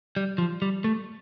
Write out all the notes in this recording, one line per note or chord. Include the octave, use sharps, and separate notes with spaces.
G3
F3
G3
A3